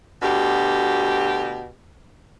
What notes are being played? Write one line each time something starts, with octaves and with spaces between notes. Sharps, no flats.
D2 B2 G4